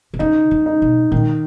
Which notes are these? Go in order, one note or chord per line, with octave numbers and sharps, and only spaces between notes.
B2
C#3 D#4
C#3
D#4
B2
A#2 D#3